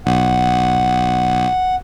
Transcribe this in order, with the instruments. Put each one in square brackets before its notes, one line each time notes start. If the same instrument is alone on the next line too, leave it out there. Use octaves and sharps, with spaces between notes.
[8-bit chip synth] B1 [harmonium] F#5